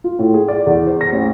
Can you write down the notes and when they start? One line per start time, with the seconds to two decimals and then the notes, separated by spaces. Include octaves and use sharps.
0.04 F4
0.19 A2
0.34 G#4
0.48 D5
0.67 E2
0.87 C5
1.01 A#6
1.13 A1